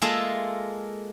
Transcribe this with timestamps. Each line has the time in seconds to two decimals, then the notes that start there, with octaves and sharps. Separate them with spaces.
0.02 G#3 A#3 F4 G#4 A4 E5